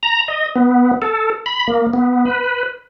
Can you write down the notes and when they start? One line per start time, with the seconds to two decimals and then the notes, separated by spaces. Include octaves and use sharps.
0.03 A#5
0.28 D#5
0.56 B3
1.02 A4
1.46 B5
1.67 A#3
1.93 B3
2.25 B4